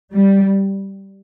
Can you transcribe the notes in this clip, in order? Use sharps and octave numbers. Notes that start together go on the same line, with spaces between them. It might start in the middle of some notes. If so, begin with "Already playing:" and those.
G3